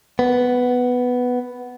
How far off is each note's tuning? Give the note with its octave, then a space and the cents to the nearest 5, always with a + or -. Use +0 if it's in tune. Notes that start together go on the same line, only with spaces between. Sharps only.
B3 +5